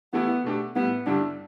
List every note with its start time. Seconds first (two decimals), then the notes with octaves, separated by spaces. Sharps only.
0.13 E3 A3 B3 E4 G4
0.44 B2 A3 D4 G4
0.75 A2 G3 B3 E4
1.06 G2 D3 G3 D4 E4 G4